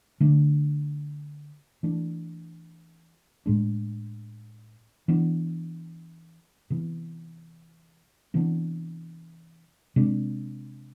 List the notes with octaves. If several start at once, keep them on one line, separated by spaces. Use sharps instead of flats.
D3 A3 D4
E3 A3 D4
A2 G#3 D4
E3 B3 D4
C3 E3 B3
C3 E3 B3 D4
C3 G#3 D4